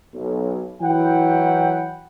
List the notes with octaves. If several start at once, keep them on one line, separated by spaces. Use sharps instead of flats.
B1
E3 F#3 E4 F#5 G5